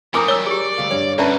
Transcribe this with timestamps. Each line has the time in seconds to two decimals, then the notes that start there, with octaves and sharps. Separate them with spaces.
0.14 A3 C4 A#4 G#5 A#5 B5 D6 D#6
0.28 F#3 G3 C#5 E6 G7
0.47 G4 G#4 D5
0.78 D2 G3 F5
0.91 G2 C#5
1.18 D2 B2 C#4 B4 D5 E5 A5 A#5